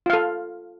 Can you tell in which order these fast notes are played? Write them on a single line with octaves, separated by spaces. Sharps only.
F4 F5 A4